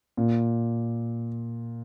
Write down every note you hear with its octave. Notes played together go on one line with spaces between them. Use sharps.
A#2